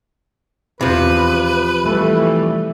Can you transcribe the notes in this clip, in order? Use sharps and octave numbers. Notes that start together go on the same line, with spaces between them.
E2 C3 F3 B4
E3 G3 A3